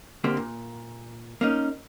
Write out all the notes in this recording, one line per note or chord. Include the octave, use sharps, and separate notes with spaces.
D3 A#3 C4 G4
A#2
A#3 C#4 D#4